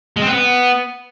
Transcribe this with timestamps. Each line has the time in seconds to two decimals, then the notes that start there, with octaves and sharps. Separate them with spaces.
0.17 G#3
0.22 C4
0.27 B4
0.32 B3